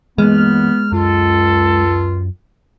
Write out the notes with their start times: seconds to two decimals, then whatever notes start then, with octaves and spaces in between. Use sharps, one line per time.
0.18 E3 G#3 A#3 B3 F6
0.92 C#2 F#2 F4 A4